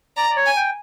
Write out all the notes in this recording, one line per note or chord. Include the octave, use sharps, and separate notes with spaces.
D5 A#5
D5
C#5
G#5
G5